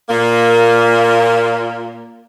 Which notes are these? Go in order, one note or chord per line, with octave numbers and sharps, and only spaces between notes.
A#2 A#3